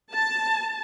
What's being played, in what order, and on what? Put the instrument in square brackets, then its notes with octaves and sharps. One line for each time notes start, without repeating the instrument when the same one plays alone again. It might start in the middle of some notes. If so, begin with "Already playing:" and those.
[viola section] A5